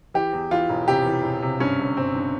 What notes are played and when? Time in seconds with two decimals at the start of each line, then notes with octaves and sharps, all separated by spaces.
0.14 E3 G4
0.33 E2
0.51 E3 F4
0.70 E1
0.88 C3 G4
1.06 E3
1.24 E1
1.42 C3
1.60 G2 C#4
1.79 G1
1.97 G1 C4
2.15 G2